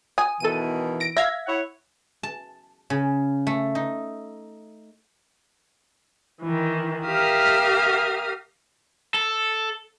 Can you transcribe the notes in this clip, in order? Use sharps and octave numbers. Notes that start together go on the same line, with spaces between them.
G#5 D#6
B2 D#3 E3 A4 D#7
A#6 D7
E5 F5 G#6 A#6
E4 C#5 F#5
A5
C#3
A3
D#4
D#3 E3
G4 A#4 E5 F5 D#6 F6
A4